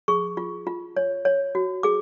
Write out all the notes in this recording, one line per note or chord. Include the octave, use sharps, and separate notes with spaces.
G#4 C#6
F4
F4
C#5
C#5
F#4
G#4 D6